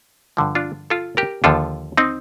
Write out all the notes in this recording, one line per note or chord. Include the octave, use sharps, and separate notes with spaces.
G2 D3 F3
D4 F4
F4 A4
G4 A#4
D#2 D3 F3 F4 A4
C4 D#4